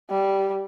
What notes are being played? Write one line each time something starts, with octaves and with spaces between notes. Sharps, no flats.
G3